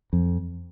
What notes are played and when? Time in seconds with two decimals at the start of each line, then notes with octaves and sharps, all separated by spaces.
0.13 F2